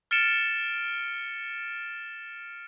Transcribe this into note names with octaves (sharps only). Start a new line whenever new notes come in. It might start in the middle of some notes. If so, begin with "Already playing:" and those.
F6 A6 C#7 D7 E7 G7